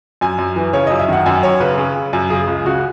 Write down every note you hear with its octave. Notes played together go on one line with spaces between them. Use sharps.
F#2 G#5
F#2
E3
C#3 C#5
F#2 D#5
E5
D#3 F#5
F#2 G#5
F#2 C#5
C#3 B4
C#3
C#3
F#2
C#3 G#4
C#2
C#3 F#4